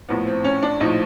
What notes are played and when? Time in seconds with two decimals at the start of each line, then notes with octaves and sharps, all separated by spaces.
0.09 A#1 A2 F3 B3
0.27 C4
0.44 C#4
0.63 D4
0.80 A#1 A2 F3 D#4